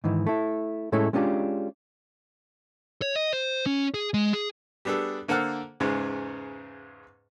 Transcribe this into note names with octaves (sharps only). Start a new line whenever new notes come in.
G#2 D#3 E3
A3 E4
A2 G#3 A3 C#4 E4 A4
G#3 C#4 D4 F4 G4
C#5
D#5
C5
C#4
G#4
G#3
G#4
G3 B3 D4 G#4 A4
D3 A#3 A4 C5 F#5 F6
E2 G#2 C#3 G#3